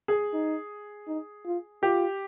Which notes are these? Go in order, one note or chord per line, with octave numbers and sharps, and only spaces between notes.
G#4
D#4
D#4
F4
F4 G4